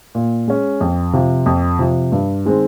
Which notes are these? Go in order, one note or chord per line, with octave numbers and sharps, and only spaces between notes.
A#2
G#3 C#4
F2
C3 F3
F2
C3 F3
G2
D#3 G#3 C4